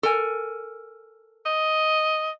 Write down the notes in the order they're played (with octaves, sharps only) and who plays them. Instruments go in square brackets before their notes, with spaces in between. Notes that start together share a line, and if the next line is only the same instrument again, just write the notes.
[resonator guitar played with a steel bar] A4 A#4 G#5
[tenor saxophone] D#5